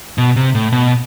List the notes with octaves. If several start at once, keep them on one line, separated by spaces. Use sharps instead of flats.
B2
C3
A2
B2